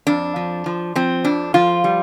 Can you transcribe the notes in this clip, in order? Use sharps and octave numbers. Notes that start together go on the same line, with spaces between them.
F2 D4
F3
F3
F3 C4
F2 D4
F3 F4
G3